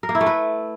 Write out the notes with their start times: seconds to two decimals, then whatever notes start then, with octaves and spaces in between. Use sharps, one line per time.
0.03 A#4
0.09 A#3
0.15 E4
0.21 A3
0.26 B4